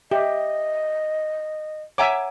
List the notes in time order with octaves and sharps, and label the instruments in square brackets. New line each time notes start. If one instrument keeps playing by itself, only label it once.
[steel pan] G4 [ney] D#5 [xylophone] E5
[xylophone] C#5 F#5 A#5 [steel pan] E5 G#5 D6